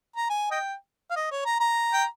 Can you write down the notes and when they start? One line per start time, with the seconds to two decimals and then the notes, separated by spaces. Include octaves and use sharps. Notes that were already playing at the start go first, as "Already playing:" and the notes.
0.16 A#5
0.29 G#5
0.51 D#5 G5
1.11 F5
1.16 D#5
1.32 C#5
1.45 A#5
1.60 A#5
1.93 G5